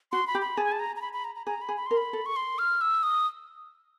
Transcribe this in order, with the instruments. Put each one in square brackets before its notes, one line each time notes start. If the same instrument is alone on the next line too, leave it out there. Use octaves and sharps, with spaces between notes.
[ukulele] F#4 [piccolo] C6
[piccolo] B5
[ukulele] G4
[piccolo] B5
[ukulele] G#4 [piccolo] A5
[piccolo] G#5
A5
A#5
A#5
B5
B5
A#5
A#5
[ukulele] G#4 [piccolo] A#5
[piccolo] B5
[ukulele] G#4
[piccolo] B5
[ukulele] A#4 [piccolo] C6
[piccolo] B5
[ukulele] A4
[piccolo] C#6
C6
F6
E6
D#6